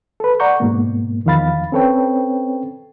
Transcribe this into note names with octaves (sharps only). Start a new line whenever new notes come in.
A4 B4
D5 F#5 A#5 C#6 G6
G#2 B2 A#3
E2 D#3 F3 F5 B5 A6
C4 C#4 A4 B4 C#5 G5